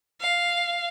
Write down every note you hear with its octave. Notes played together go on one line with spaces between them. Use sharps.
F5